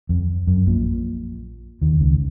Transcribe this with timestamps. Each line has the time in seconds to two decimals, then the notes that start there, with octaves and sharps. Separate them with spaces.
0.09 F2
0.47 F#2
0.67 A#1 A#2
1.81 D#2 D#3
2.00 C#2 C#3